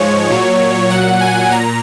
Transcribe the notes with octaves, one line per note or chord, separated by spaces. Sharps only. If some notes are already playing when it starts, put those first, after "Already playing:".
Already playing: G#2 F3 G#3 C#5
A#2 F#3
A#2 F#3 F#5
G#5
A#2 A#5